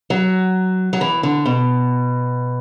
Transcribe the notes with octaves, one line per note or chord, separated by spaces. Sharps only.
F#3
F#3
E3
D3
B2